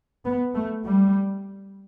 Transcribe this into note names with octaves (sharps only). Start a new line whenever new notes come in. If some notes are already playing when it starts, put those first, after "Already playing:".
B3
A3
G3